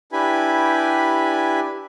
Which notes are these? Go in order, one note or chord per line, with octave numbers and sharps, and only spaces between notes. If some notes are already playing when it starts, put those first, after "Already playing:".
D4 E4 G4 B4 G#5 B5